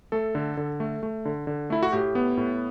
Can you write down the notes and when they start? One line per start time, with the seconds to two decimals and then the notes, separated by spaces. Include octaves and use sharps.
0.12 A3 A4
0.35 D3
0.57 D3
0.80 A3
1.03 A3
1.25 D3
1.47 D3
1.70 A3 E4
1.83 F#4
1.92 A2 G4
2.15 B3
2.37 A2